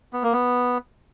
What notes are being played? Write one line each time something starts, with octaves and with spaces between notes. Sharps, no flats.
B3
A#3
B3